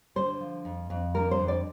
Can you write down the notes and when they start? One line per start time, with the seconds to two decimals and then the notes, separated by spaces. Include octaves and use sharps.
0.16 D3 C5
0.40 F3
0.65 F2
0.90 F2
1.14 D3 A#4
1.31 C5
1.39 F2
1.48 D5